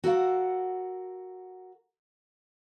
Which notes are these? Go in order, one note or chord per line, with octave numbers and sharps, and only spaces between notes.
F#4 A4 A#4 C#5 F5 F#5